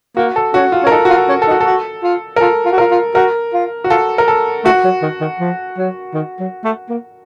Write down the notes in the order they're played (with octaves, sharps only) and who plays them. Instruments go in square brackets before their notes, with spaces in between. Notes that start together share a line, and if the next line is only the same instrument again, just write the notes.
[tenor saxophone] A#3 [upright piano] F#4
[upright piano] A4
[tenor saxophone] C#4 [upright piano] F#4
[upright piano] F4
[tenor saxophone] C#4
[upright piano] A#4
[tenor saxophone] D#4 [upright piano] A4
[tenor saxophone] F4 [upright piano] F#4
[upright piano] A4
[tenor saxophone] C#4
[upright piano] A4
[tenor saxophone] D#4
[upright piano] F#4
A4
[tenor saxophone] F#4
F4
[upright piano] A#4
[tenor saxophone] F4 [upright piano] A4
[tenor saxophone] F4
F#4
[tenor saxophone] F4 [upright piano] A#4
[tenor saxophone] F4
[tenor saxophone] F#4 [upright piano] A#4
[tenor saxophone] F4
[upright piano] F#4
[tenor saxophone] F4 [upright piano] A4
[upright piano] A#4
A4
[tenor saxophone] A3 [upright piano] F#4
[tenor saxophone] F#3
D#3
D#3
F3
F#3
D#3
F#3
A3
A#3